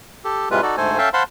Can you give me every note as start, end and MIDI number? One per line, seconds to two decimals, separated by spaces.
0.25 0.49 67
0.25 0.49 69
0.51 0.61 45
0.51 0.61 48
0.51 0.61 55
0.51 0.61 56
0.51 0.61 65
0.51 0.61 71
0.62 0.76 63
0.62 0.76 66
0.62 0.76 69
0.62 0.76 74
0.77 0.98 38
0.77 0.98 44
0.77 0.98 57
0.77 0.98 69
0.77 0.98 72
0.77 0.98 80
0.98 1.09 61
0.98 1.09 69
0.98 1.09 76
0.98 1.09 77
0.98 1.09 79
0.98 1.09 81
1.14 1.23 72
1.14 1.23 77
1.14 1.23 78
1.14 1.23 81
1.14 1.23 83
1.14 1.23 84